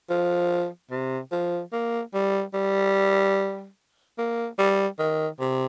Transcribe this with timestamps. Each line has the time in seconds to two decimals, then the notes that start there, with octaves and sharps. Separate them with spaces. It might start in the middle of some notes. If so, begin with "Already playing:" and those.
0.10 F3
0.91 C3
1.32 F3
1.73 A#3
2.14 G3
2.54 G3
4.18 A#3
4.58 G3
4.99 D#3
5.40 C3